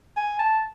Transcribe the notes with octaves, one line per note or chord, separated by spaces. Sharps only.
G#5
A5